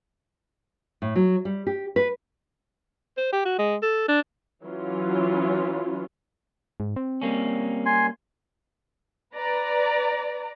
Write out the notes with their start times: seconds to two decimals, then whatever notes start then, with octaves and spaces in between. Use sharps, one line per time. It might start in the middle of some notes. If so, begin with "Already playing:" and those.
1.02 A2
1.16 F#3
1.45 G3
1.67 G4
1.96 B4
3.17 C5
3.32 G4
3.45 F#4
3.58 G#3
3.83 A4
4.08 D4
4.64 E3 F#3 C#4 F4
6.80 G#2
6.96 C4
7.22 G3 A#3 C#4
7.86 G#5 C6
9.35 B4 D5 A#5